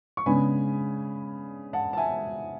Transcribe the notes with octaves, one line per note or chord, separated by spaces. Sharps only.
C#6
C#3 G#3 B3 D4 G#5 B5
F#5 A5
A5
E5 G#5